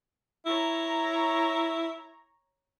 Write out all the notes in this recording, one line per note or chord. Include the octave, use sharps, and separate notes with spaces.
E4 C#5 A#5